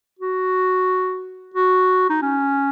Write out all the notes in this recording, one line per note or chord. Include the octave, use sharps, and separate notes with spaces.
F#4
F#4
D#4
C#4